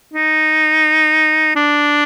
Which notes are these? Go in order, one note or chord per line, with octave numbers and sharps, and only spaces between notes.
D#4
D4